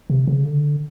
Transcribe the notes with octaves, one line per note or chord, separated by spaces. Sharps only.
C3
C#3
D3